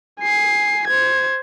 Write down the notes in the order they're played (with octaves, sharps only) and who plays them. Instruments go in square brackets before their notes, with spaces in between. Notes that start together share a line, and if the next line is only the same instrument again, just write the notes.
[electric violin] G#5 C7
C5 G#6